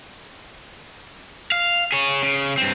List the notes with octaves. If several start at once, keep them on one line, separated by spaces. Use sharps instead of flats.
F5
G#4 C#5
C#3
G2 C4